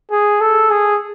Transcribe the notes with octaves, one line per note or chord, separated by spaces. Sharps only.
G#4
A4
G#4